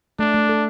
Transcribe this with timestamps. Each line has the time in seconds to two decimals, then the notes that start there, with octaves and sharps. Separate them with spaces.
0.19 A3 D4
0.34 A3
0.49 A4